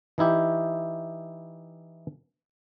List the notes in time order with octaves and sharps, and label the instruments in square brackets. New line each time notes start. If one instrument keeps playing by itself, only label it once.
[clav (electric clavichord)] E3 D#4 E4 G4